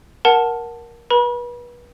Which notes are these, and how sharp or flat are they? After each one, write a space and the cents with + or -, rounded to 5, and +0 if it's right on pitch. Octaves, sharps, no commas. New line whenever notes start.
A#4 +15 F#5 +0 A5 +0
B4 -30 B5 -35